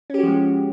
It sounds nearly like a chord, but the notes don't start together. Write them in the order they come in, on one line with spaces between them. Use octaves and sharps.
C#4 G4 F#4 F3 G#3